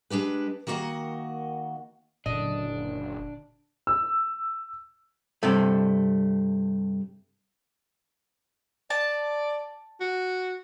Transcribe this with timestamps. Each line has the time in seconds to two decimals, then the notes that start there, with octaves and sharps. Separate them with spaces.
0.10 G#3 D4 G4 B4
0.67 D#3 A#3 F#4 D#5 F#5
2.26 F#1 A#2 D3 D4 D#5
3.87 E6
5.43 G2 C3 A3
8.90 D5 A5
10.00 F#4